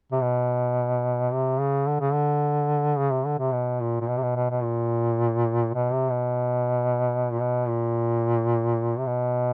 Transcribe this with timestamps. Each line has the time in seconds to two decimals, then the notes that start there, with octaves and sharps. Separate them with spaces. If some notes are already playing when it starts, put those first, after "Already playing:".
0.12 C3
0.21 B2
1.32 C3
1.60 C#3
1.87 D3
2.00 C#3
2.13 D3
2.97 C#3
3.11 C3
3.26 D3
3.39 C3
3.52 B2
3.81 A#2
4.01 A#2
4.09 B2
4.17 C3
4.23 B2
4.36 B2
4.51 B2
4.63 A#2
5.75 B2
5.92 C3
6.11 B2
7.32 A#2
7.41 B2
7.68 A#2
8.98 C3
9.07 B2